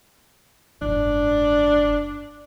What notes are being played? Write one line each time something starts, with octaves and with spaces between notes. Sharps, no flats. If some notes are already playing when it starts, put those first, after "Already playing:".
F#1 G#2 D4